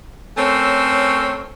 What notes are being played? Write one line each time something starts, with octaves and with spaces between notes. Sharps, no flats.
A3 C4 C#4 A4 A#4 C#5